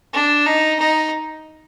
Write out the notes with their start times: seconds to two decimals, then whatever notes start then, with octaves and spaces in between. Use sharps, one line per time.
0.13 D4
0.46 D#4
0.80 D#4